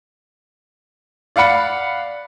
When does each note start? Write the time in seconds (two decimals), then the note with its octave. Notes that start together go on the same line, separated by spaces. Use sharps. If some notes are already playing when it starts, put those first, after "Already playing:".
1.36 D5 F5 F#5 B5 C#7